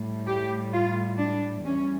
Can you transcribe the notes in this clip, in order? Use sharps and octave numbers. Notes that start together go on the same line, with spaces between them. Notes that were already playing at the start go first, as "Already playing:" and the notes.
Already playing: A2 G3
G4
F4
D4
E2 E3 G3 C#4